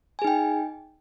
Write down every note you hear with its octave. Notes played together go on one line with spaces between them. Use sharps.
D#4 G#4 G5 G#5